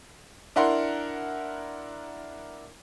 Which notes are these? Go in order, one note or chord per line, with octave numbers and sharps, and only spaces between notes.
D4 E4 A#4 F#5 C6